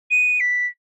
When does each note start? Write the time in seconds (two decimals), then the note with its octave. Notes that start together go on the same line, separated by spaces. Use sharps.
0.11 D#7
0.40 B6